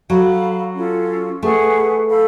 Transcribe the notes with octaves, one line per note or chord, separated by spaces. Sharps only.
F#3 A4 F5 B5
C#4 F4 A4
A3 G#4 B4 F#5 C#6
A4 F5 B5